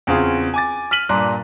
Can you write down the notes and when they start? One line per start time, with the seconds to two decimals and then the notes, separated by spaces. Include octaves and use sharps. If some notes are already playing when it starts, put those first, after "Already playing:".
0.07 E2 C#3 C4 F4 G#4 C6
0.54 G#5 D6 A6
0.91 F6 B6 D#7 F#7
1.09 G2 A#2 D4 A#5 C6 F#6